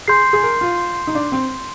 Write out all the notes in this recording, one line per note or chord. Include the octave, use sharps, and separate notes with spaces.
G#4 C6 G6 C7
G#4
A#4
F4
D#4
D4
C4